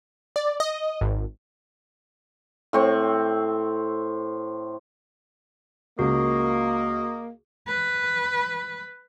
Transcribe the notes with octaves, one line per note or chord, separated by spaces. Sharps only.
D5
D#5
G#1
A2 C4 C#6
C#2 A#3 F#4 D#5
B4